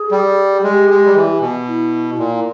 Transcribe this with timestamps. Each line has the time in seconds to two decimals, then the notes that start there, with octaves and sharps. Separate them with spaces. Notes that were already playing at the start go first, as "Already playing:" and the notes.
Already playing: G#4
0.11 G3
0.52 G#4
0.63 G#3 G4
0.90 G#3
1.06 G3
1.15 E3
1.41 B2
1.67 E4
2.18 A#2